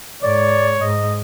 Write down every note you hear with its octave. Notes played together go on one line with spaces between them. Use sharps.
G#2 C#5 D5
G#2 D#5